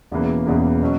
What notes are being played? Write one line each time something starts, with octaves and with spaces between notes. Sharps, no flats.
E1 E2 C#3 E3 A#3
E1 E2 C#3 E3 A#3
B2 F#3 C#4